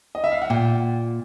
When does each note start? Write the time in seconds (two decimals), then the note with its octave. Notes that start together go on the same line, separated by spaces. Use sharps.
0.15 D#5
0.24 E5
0.31 F5
0.42 F#5
0.50 A#2 G5